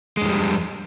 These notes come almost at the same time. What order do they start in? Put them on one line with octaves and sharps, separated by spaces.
G#3 F2 G3